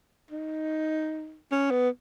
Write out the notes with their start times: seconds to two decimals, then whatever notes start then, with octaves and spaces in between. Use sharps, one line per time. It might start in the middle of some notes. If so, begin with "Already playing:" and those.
0.31 D#4
1.52 C#4
1.71 B3